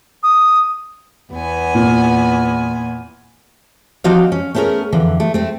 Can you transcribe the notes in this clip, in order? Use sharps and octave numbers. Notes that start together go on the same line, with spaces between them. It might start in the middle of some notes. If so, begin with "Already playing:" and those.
D#6
E2 B3 G#5
A#2
F3 C4 D#4 F#4 D5 F5
C#4
A3 B3 C#4 G#4 A#4
F2 D3 E3
A3
A3 C4